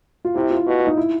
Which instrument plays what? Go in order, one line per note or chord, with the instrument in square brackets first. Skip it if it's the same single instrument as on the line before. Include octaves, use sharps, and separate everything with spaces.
[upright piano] F4
[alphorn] C3 [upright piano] E4
[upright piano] F4
[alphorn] B2
[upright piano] D#4
E4